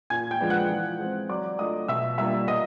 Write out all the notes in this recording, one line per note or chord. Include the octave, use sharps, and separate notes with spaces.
A#2 G#5 G#6
G5 G6
F3 G#3 B3 D4
F#5 F#6
E3
G#3 C4
F#3 D5 D6
A3 D4 F4 D#5 D#6
B2 E5 E6
G3 A#3 D4 F4 E5 E6
A#2 D#5 D#6